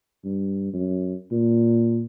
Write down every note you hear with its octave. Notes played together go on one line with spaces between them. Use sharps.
G2
F#2
A#2